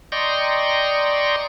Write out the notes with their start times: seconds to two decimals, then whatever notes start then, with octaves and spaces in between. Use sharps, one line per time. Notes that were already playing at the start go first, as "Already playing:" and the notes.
0.12 D5 D#5 G5 A#5 C6 C#6